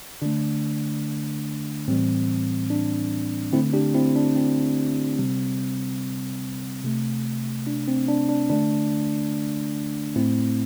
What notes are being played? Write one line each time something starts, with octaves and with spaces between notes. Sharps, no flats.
D3 A3 D4
A2 E3 G3 C4
D4
D3 A3 C4 E4
D4 G4
C4 E4
D4
C4
C3 G3
C3 A3
D4
C4
D4
D4
D3 A3 D4
A2 A3 C4 E4